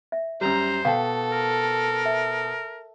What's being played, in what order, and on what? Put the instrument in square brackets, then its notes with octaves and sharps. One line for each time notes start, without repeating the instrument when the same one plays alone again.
[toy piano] E5
[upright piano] F#2 G3 [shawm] C5 [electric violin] A#5
[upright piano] B2 [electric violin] A4 [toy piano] F5 G5
[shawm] A#4
[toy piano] E5